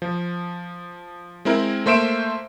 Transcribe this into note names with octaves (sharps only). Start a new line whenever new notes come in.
F3
G#3 C4 E4 A#4
A3 A#3 C5 E5 D7 E7